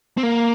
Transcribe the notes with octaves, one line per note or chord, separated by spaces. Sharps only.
C4
A#3